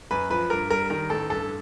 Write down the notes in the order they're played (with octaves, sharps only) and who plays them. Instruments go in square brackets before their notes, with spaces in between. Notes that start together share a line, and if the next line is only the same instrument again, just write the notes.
[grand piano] F#2 B4
F3 B4
G2 A#4
G3 A#4
D#3 A#4
A1 A4
G2 A4